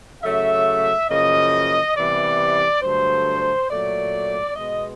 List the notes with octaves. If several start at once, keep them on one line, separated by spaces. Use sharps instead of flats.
C#3 F#3 A3 E5
F#2 C#3 F3 A#3 D#5
C3 E3 G3 B3 D5
G2 D3 F#3 A3 C5
A#2 F#3 A3 D5
B2 G#3 B3 D#5